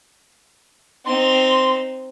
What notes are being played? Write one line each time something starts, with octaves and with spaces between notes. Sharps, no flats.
C4 D#4 C6